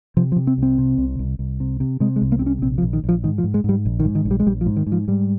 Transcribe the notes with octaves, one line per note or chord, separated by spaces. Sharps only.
C3 F3
F3
C3
C4
C2 C4
C3
C2
C2
C2
C3
C3
C3 G#3
G#3
C2
A#3
C4
C3 C#4
A#1 C4
F3
A#1
D#3
A#1
F3
G#2 D#3
F3
G#2
G#3
G#2 G3
A#1
D#3
G#2
D#3
A#1
G3
G#3
A#1 G3
F3
G#2
D#3
G#2
F3
G#2 G3